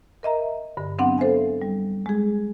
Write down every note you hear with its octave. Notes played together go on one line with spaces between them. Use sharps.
A#4 D#5 E5 A#5
G2 D3
F#3 B3 C4 D4 F5 F#5
A4 C5 E5 F5 G#5
G3
G#3 G#4